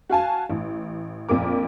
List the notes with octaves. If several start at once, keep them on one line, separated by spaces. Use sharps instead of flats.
F#4 F5 G#5 A5
A1
A#1 F2 A#4 D6